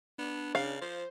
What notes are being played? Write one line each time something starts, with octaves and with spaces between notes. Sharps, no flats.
B3 D4
C#3 F5
F3 C5